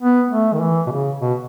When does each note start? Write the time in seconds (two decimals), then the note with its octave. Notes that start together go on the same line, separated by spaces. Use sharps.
0.01 B3
0.30 A3
0.54 D#3
0.60 E3
0.87 B2
0.91 C#3
1.20 B2